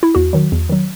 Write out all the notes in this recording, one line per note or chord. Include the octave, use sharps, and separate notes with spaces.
E4
E2 F#4
D#3 F#3
E2
D#3 F#3